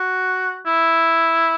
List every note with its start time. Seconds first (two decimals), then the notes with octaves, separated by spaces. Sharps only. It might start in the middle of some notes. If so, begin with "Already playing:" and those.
Already playing: F#4
0.66 E4